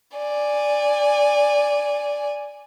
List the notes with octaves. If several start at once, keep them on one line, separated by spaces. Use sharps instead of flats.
D5 G#5